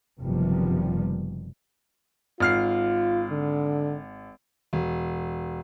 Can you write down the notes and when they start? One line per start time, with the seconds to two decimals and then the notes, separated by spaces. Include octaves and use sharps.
0.20 F#1 C3 D#3 F3 G3 B3
2.40 G#1 F4 F6 C7
3.30 D3
4.73 E1